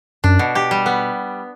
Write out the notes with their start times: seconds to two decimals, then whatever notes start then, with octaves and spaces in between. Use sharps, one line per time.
0.24 F#2 D4
0.39 B2
0.55 G4
0.71 G3
0.86 B3